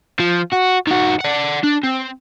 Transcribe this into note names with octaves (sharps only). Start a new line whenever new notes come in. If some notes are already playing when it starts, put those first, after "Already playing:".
F3
F#4
D#3 F#4
D5 F#5
D4
C4